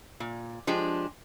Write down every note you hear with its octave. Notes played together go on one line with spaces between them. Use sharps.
A#2
F3 G#3 D4 G4